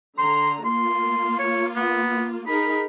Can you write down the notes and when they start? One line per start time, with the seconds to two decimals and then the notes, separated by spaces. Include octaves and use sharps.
0.18 D3 A#5 C6
0.65 A#3 F4 C6
1.39 C#5
1.76 B3
2.47 D#4 G#4 A#4 B5